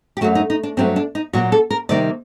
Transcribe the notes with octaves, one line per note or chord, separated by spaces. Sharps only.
G4
F#2 F#3 A3 F#4
D#4
D#4
D4
G2 F#3 A3 C4
D4
D#4
A#2 F#3 A#3 F#4
A4
A#4
C3 D#3 G3 A#3 D5